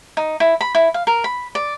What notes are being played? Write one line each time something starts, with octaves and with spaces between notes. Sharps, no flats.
D#4
E4
B5
E4
F5
A#4
B5
D5